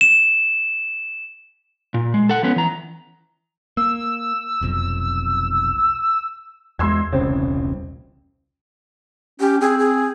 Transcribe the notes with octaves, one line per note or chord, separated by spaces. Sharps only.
E7
A#2
G#3
A4 F#5
F3 B3 C#4 B4
E3 A#5
A#3 E6
F1 B1 F2
E2 G#3 C6 E6 G#6
E1 C2 C#3 C4
C#4 G4
C4 G#4
G#4